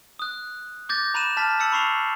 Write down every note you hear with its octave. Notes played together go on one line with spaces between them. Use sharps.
D#6 F#6
D6 G6 A6 A#6
A#5 B5 F#6 D#7 E7
A5 F6 A6 B6
A5 E6 A6 C#7 F#7
B5 C#6 C7 F7